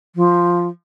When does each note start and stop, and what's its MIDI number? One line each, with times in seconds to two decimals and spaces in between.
0.15 0.67 53